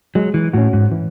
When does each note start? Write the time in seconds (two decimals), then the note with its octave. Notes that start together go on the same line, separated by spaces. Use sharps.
0.15 F#3 G#3
0.34 E3
0.53 A2 C#4 F#4
0.73 G#2
0.92 E3